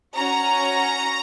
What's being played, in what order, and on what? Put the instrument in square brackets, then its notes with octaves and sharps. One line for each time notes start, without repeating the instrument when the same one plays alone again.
[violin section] C#4 F#4 A#5